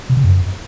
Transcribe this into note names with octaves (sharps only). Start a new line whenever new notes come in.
C3
C#3
F#2